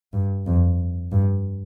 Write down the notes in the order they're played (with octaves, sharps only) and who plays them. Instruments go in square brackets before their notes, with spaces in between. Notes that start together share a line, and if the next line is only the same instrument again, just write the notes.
[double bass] G2
F2
G2